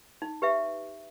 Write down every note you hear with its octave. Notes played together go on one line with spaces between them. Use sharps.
D#4
G4 B4 E5